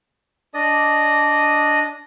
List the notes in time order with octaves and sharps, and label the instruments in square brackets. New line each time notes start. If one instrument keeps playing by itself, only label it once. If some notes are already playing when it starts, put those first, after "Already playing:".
[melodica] D4 D5 D#5 D#6